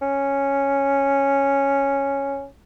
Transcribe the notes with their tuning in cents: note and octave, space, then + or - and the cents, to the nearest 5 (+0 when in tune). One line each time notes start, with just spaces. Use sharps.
C#4 -5